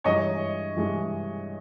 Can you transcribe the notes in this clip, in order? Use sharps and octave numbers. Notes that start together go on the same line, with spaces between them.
G2 E3 G#3 C#5 D#5
G2 E3 G#3